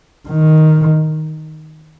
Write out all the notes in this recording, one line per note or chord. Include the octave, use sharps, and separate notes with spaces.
D#3